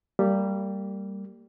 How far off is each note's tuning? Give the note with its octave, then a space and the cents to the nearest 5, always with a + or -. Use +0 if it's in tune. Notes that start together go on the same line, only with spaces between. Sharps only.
G3 +0 A#3 -30